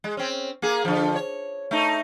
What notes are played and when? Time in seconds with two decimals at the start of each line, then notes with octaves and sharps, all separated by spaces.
0.04 G#3
0.17 C4 C#4
0.62 A#3 G#4
0.85 D3 F3
1.16 C#5
1.71 A3 D#4